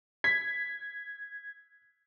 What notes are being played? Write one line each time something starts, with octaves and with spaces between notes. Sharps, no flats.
G#6 B6